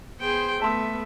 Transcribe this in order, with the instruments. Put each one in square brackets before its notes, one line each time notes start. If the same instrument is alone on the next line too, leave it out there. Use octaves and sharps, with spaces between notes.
[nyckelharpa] B3 C5 [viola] G#4 G5
[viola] A3 [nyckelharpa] B3 E5 [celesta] A5 C6 E6